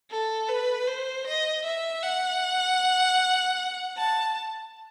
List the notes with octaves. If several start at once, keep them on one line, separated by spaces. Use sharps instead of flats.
A4
B4
C5
D#5
E5
F#5
A5